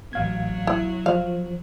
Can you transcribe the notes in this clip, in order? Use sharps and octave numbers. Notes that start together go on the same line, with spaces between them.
A1 F#3 F5 G#6
E4
F3 F5